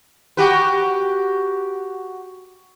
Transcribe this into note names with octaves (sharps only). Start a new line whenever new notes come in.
F#4 G4 B4